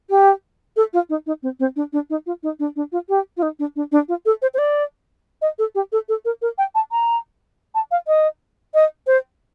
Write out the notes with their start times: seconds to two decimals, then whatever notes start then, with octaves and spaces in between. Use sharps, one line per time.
0.10 G4
0.76 A4
0.93 F4
1.09 D#4
1.26 D#4
1.43 C4
1.60 C4
1.76 D4
1.93 D4
2.10 D#4
2.26 F4
2.43 D#4
2.59 D4
2.76 D4
2.92 F4
3.09 G4
3.37 F4
3.42 D#4
3.59 D4
3.76 D4
3.92 D4
4.08 F4
4.26 A4
4.42 C5
4.54 C5
4.58 D5
5.42 D#5
5.59 A4
5.75 G4
5.92 A4
6.09 A4
6.25 A#4
6.42 A#4
6.58 G5
6.75 A5
6.92 A#5
7.75 A5
7.91 F5
8.07 D#5
8.74 D#5
9.07 C5